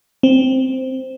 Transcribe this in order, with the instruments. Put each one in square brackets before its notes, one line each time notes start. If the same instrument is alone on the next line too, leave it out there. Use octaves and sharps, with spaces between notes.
[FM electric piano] C4